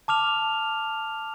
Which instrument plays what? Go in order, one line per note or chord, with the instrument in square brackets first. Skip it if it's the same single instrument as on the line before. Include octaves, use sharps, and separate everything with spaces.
[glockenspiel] A5 D6 F6 F7